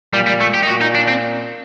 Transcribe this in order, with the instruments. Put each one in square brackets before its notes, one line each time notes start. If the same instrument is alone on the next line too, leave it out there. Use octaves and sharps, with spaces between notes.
[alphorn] A#2 [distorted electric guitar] G3
[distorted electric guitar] G3
A3
G4
D#4
[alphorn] A#2 [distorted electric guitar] F#4
[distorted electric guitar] D#4
D4
C4